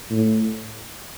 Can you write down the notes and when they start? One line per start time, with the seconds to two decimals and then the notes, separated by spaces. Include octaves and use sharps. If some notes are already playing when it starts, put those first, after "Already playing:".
0.10 A2